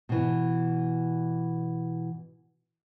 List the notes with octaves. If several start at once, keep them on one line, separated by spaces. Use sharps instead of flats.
B2 E3